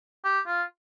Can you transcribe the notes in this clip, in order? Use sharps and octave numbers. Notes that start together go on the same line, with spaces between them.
G4
F4